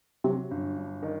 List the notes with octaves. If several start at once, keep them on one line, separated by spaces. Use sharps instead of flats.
C3 F#3
G1
G2
D#3